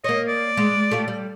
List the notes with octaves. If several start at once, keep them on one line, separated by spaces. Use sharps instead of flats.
A#3 C#5 D#5
D5
G#3
A3 F4 G4
G3